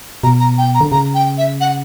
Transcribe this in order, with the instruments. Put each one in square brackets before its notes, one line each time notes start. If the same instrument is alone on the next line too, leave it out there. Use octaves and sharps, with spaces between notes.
[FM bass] B2 [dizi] A#5
[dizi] A#5
G5
A#5
[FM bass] D3
[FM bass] C#3 [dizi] A#5
[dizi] G5
E5
F#5